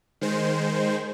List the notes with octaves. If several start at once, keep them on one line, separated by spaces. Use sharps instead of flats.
D#3 G#3 C5